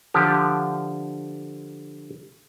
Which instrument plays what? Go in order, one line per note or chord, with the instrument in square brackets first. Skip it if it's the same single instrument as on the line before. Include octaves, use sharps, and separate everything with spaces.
[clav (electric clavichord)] D3 F3 G4